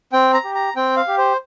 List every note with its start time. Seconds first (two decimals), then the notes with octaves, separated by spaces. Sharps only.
0.13 C4 G5
0.34 A#5
0.44 G4
0.55 A#5
0.76 C4 G5
0.97 F5
1.08 G4
1.18 C5